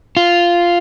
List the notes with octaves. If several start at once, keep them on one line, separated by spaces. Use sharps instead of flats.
F4